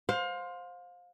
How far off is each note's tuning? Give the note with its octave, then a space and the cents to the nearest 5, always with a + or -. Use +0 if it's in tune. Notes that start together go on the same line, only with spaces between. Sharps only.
C5 +0 F5 +30